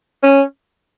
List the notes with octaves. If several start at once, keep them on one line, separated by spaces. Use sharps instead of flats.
C#4